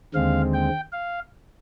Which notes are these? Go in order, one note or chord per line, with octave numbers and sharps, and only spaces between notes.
D#2 D3 G#3 C4 F5
G5
F5